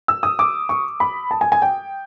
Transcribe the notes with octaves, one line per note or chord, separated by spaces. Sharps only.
E6
D#6
D6
C#6
B5
A5
G#5
G#5
G5